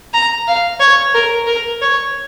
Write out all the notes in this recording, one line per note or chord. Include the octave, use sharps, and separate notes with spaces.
A#5
F5
C#5
A#4
A#4
C#5